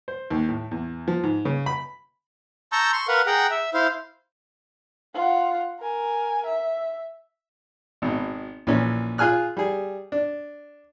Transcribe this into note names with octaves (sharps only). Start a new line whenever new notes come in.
C5
D#2
A2
E2
F3
G#2
C#3
B5
A5 A#5 C#6 E6 G6
C6 C#6
A#4 B4 F5 F#5
G#4 F#5 G5 A#5
E5
E4 C5 F5
F4 F#5
A#4 G#5
E5
G#1 B2
A#1 E3 C#4
F4 G#4 G#5 F6 F#6
G3 G#4
D4